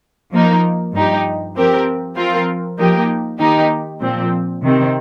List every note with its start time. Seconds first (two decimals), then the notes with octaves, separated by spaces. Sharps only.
0.32 F3 A#3 D#4 A#4
0.94 G2 F3 D#4 G4
1.55 F3 C4 G4 A#4
2.16 F3 C4 F4 A#4
2.78 F3 A#3 D#4 G4 A#4
3.39 D#3 A#3 D#4 G4
4.01 A#2 F3 C4
4.62 C3 D#3 C4